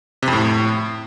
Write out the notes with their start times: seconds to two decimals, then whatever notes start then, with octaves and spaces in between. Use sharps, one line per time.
0.22 C3
0.28 F2
0.33 A2